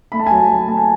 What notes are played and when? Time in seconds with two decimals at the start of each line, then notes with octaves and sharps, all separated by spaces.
0.12 A3 B5
0.19 A5
0.27 G#5
0.31 F#3 A5
0.49 F#3
0.67 A3 A5
0.78 G#5